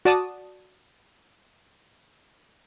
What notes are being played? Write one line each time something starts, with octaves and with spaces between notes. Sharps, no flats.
F#4 D5 A5 D#6